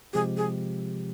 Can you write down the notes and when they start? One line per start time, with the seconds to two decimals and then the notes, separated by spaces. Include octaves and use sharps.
0.13 C3 F3 G#3 C4 G4 G#4
0.37 G#4